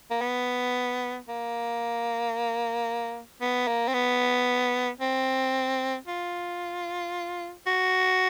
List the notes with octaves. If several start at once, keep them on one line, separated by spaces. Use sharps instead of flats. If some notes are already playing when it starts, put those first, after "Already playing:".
A#3
B3
A#3
B3
A#3
C4
B3
C4
F4
F#4